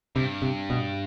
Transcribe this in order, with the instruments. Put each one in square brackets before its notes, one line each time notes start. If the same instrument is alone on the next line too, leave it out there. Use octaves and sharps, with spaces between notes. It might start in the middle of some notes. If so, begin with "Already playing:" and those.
[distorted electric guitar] G2 [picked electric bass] C3
[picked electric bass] C3
B2